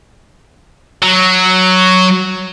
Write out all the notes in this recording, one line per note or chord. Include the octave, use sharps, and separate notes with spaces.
F#3